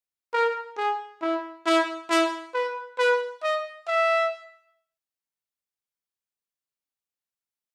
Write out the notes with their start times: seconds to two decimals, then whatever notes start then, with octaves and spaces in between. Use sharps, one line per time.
0.33 A#4
0.77 G#4
1.22 E4
1.66 E4
2.10 E4
2.54 B4
2.98 B4
3.43 D#5
3.88 E5